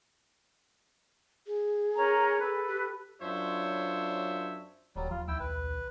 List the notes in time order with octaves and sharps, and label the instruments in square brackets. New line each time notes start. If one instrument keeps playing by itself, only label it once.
[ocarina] G#4
[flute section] C#4 A#4 A#5
A4 B4
[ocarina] G4
[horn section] F#2 D4 F4 C5 C#5 E5
[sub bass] D1 [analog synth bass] D#2 [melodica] F#3 G3
[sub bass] F3 [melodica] F4
[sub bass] C#2 [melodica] E4 G5 E6
[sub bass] B1 [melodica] B4